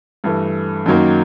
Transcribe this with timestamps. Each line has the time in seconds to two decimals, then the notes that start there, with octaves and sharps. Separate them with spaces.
0.24 G2 E3 A3
0.86 F#2 D#3 F#3 A#3